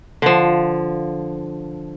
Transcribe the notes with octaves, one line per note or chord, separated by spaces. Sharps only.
D3 F3